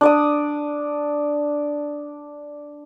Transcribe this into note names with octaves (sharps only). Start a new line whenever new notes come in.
D4 D5 D#6